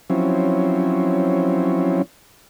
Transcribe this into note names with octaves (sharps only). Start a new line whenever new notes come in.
F3 F#3 C4 C#4 E4